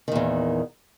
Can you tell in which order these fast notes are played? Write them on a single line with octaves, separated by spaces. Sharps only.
D#3 A#2 E2